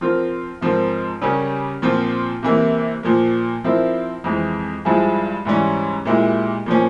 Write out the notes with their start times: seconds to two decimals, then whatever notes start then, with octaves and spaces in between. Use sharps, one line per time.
0.01 F3 C4 F4 A#4
0.61 G#2 F3 C4 F4 A#4
1.22 C#3 G3 C#4 G4 A#4
1.82 A#2 F3 C4 F4
2.43 C3 E3 A#3 E4
3.03 A#2 F3 A#3
3.64 F3 C4 E4 A#4
4.24 F2 E3 G#3 C4
4.85 G2 F3 G#3 E4 G#4
5.45 G#2 E3 G3 C#4
6.05 A#2 G#3 E4 G4
6.66 A#2 F3 A#3 C#4